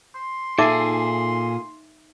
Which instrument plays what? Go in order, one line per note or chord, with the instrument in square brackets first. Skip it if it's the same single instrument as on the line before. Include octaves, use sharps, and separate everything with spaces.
[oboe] C6
[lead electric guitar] A#2 G#4 [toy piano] D#4 E5 D6 [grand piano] A4